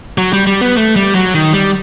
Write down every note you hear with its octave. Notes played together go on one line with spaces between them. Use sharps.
F#3
G3
G3
B3
A3
G3
F#3
D#3
G3